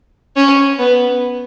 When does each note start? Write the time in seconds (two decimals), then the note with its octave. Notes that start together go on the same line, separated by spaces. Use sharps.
0.37 C#4
0.79 B3